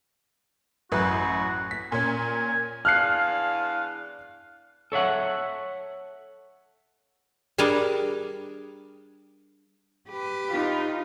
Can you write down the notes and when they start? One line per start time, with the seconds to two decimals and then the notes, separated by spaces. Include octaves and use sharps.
0.92 A1 F#2 F#4 B4
1.71 B6
1.92 A#2 C#4 G#5
2.85 E2 D4 F5 F6 F#6 C7
4.92 A4 C#5 E5 F#5
7.58 G3 D4 G#4 A#4 D5 D#5
10.10 G4 B4
10.52 D#4 F4